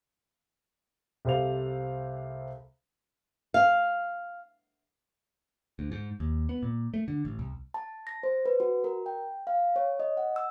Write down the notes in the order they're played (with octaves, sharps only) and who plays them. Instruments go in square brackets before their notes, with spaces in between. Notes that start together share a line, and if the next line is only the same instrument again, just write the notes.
[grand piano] C2 G4 A4 C5 F5 F7
[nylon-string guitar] F5
[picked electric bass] D2
G#2
D#2
B3
A#2
A3
D3
A1
C2
[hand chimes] A5
A#6
C5
B4
F#4
A#4
G5
F5
C#5
D#5
F#5
E6